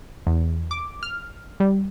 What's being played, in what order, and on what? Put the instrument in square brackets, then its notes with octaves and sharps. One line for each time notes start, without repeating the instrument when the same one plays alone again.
[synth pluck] E2
D6
F6
G3